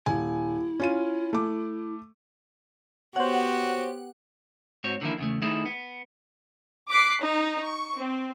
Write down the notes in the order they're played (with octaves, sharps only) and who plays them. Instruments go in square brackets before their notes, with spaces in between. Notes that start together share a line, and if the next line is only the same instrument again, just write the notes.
[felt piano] D#1 G#5 [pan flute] E4
[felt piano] C#4 F4 D#7
A3 D6
[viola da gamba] B3 G4 [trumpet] F#4 [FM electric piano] C5 C#5 [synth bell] F#5
[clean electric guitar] G#2 C4 F#4 C#5
D3 D#3 F3 A#3 E4
E2 C#3 A3
D#3 A3 D#4 E4 G#4 A4
B3
[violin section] D6 F#6 B6 C7
D#4
C#6
C4